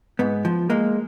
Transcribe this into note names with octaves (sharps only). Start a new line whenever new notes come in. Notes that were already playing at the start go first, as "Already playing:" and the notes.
G#2 B3
F3
G#3 A#3